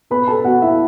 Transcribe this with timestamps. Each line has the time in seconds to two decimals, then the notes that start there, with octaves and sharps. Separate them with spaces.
0.10 B2 B4 B5
0.27 A4 A5
0.45 B2 F#4 F#5
0.62 E4 E5